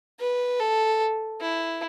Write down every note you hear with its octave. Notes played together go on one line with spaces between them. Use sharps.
B4
A4
E4